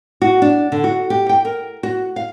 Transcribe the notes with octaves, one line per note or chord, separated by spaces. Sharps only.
F#4
D4
D3
F#4
G4
G5
A#4
F#4
F5